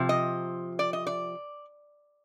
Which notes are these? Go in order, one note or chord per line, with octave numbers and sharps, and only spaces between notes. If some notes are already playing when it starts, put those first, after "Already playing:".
Already playing: C3 F3
D#5
D5
D#5
D5